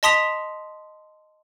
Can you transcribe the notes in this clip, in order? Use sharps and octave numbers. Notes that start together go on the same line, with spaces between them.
D#5 A5 C6 D#6 B6 F7